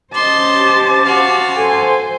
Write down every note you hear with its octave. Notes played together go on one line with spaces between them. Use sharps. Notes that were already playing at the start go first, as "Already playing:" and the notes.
C#4 G4 C5 D#5 A5 C6 D6
F#4 F5
A4 C5 G#5